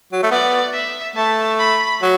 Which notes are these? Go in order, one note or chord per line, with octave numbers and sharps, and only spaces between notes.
F#3
A3
B3 D5
E5
A3 A5
B5
F#3